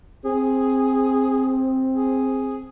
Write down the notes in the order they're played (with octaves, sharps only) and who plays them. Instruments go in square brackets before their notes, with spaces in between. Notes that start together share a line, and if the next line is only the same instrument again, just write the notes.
[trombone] C4 [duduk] G#4
[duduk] G#4